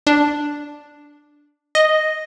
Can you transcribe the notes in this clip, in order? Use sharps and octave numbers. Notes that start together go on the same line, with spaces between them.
D4
D#5